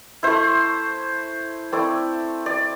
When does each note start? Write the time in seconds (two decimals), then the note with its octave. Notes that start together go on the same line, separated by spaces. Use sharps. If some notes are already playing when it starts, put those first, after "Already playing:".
0.23 A3 E4 C5
1.72 A3 C4 E4 D5
2.46 D5